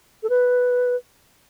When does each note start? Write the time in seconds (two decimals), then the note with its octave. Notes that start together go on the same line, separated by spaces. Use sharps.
0.23 A4
0.30 B4